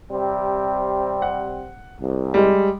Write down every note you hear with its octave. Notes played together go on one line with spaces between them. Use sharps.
C3 G3 C4
F#5
C2
G3 G#3